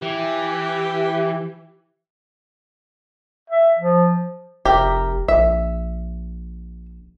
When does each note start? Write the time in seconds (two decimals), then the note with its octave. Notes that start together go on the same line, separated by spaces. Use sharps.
0.02 E3 G4
3.50 E5
3.79 F3
4.65 F1 G4 A#4 E5
5.28 A#1 E5